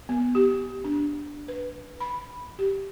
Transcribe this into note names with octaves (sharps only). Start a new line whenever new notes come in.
B3
G4
D4
B4
B5
G4